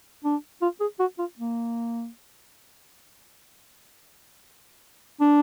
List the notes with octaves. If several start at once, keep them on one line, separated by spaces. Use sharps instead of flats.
D4
F4
G#4
F#4
F4
A#3
D4